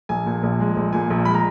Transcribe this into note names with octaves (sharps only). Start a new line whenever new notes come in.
A#1 G#5
A#2
A#1
G#3
A#1
A#2 G#5
A#1
G#3 B5
A#5